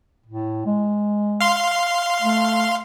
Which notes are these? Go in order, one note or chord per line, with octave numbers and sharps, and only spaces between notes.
A2
G#3
F5 C6
A3